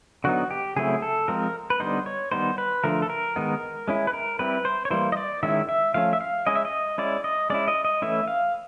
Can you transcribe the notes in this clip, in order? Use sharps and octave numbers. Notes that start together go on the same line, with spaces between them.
D3 F#3 B3 D#4 F#4
G4
C#3 F#3 A3 C4 E4 G#4
A4
F3 G#3 C4 A#4
B4
D3 G3 B3 D#4 C5
C#5
D#3 G3 B3 D#4 C5
B4
D3 F3 A3 A#4
A4
A#4
D#3 G#3 B3 D#4
G#3 C#4 E4
B4
A#4
G3 C4 E4 B4
C5
C#5
E3 G3 A#3 C5
D#5
D5
D#3 G#3 C#4 E4 E5
E5
F3 A3 C#4 F5
E5
F5
G#3 C#4 E4 D#5
E5
D#5
G#3 C#4 E4 D5
D#5
G#3 C#4 E4 D5
D#5
D#5
E3 A3 C#4 E4 E5
F5